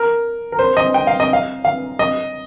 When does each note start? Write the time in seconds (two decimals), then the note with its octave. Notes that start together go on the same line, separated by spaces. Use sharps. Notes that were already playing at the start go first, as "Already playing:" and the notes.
Already playing: A#4
0.52 A#4
0.59 C5
0.77 D#5
0.94 G5
1.07 F5
1.20 D#5
1.33 F5
1.65 F5
1.99 D#5